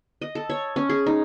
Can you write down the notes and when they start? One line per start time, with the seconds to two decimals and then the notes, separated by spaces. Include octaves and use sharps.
0.21 D#5
0.35 A4
0.50 C#5
0.76 C#4
0.89 G#4
1.06 D#4